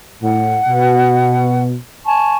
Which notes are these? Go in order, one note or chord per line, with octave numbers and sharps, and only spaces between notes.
A2 F#5
B2
G#5 A5 C#6